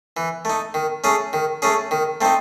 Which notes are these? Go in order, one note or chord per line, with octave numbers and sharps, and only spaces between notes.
E3
A3 D#4
D#3
A3 C#4 G#4
D#3
A3 C#4 G#4
D#3
A3 C4 D#4